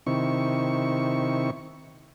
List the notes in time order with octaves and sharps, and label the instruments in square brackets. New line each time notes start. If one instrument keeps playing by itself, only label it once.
[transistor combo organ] C3 D#3 E4 C#6